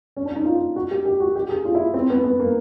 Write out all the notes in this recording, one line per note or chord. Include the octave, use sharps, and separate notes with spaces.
C#4
D4
D#4
F4
F#4
G4
G4
F#4
G4
G#4
F4
E4
C4
B3
B3
A#3